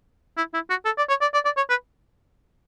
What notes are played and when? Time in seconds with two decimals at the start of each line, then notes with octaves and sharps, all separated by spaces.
0.37 E4
0.54 E4
0.70 F#4
0.85 A4
0.98 D5
1.09 C#5
1.21 D5
1.34 D5
1.45 D5
1.57 C#5
1.70 B4